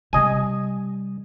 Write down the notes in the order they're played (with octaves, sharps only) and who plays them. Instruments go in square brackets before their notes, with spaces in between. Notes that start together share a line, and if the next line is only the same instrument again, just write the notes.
[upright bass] C3 G3 [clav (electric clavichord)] D#5 G#5